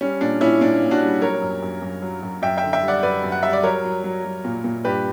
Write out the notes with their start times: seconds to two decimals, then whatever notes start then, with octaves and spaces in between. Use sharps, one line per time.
0.01 G3 C#4
0.21 A#2 D4
0.41 A#2 C#4 E4
0.61 A#2 D4
0.81 A#2
0.91 D4 F#4
1.02 G3
1.22 F#3 A#4 C#5
1.42 F#2
1.62 F#2
1.82 F#2
2.02 F#3
2.23 F#2
2.42 F#2 E5 G5
2.57 E5 G5
2.63 D3
2.73 E5 G5
2.83 G3
2.88 D5 F#5
3.03 F#2 B4 D5
3.24 F#2
3.32 F#5
3.43 G3 E5
3.53 D5
3.63 F#3 A#4 C#5
3.84 F#3
4.04 F#3
4.25 F#3
4.45 A#2
4.64 A#2
4.85 G2 G4 B4